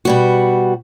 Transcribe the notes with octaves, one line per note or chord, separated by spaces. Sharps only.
B2 G3 F#4